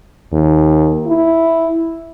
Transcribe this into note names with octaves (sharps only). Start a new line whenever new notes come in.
D#2
E4